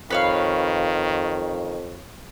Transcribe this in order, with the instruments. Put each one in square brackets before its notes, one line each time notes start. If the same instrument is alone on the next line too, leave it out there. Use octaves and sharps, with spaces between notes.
[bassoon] F2 [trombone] D#3 [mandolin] B4 C#5 F5